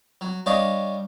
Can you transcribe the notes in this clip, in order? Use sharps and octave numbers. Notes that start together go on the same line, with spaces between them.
F#3
G3 D4 C#5 D#5 F5